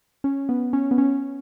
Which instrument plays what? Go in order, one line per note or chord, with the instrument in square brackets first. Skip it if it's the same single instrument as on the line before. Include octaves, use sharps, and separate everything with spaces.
[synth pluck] C#4
B3
C#4
B3
C#4